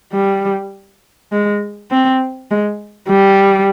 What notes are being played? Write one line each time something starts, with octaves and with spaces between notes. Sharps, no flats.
G3
G#3
C4
G#3
G3